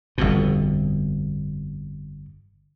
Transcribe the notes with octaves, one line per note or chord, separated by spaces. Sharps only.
G1 F2 B2